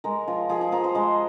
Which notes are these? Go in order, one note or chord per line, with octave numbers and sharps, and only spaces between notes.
G#3 A#4
F3
F3 G#4
G#4
F3 A#4
C5
G#3 D#5